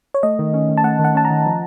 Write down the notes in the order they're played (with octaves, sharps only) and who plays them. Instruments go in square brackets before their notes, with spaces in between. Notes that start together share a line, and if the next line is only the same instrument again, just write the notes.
[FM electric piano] C#5
[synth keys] A3 [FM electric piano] D#5
[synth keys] D#3
C#4
D#3
[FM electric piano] A5
[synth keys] A3 [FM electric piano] F#5
[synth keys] D#3
[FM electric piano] F#5
[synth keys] C#4 [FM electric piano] A5
[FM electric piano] A#5
[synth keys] D#3
F3